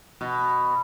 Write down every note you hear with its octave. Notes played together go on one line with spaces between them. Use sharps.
B2